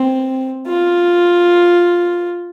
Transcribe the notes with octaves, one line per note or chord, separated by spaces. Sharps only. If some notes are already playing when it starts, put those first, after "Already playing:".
Already playing: C4
F4